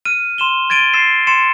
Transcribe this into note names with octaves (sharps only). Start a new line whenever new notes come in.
F6 D#7
C6 E7 G7
G#6 A6 D7 D#7 G7
E6 A6 C7 E7
C6 A6 C#7 E7